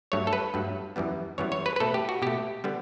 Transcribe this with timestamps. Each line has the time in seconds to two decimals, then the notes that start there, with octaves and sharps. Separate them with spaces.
0.12 G2 F#3 A3 C#5
0.27 A4
0.33 B4
0.54 G2 F#3 A3
0.96 F#2 E3 G3 B3
1.38 F#2 E3 G3 B3 C#5
1.52 C#5
1.66 B4
1.76 B4
1.80 B2 A3 A4
1.94 G4
2.09 F#4
2.22 B2 A3 G4
2.64 D3 G3 B3